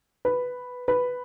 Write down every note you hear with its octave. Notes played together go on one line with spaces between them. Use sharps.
B4
B4